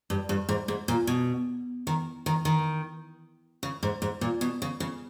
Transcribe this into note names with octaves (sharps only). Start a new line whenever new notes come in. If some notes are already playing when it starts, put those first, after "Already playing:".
G2
G2
G#2
G#2
A#2
B2
D#3
D#3
D#3
C#3
G#2
G#2
A#2
B2
C#3
C#3